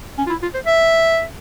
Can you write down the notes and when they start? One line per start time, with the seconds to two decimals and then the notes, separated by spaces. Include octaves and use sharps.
0.18 C#4
0.27 F4
0.30 E4
0.42 F4
0.54 C5
0.66 E5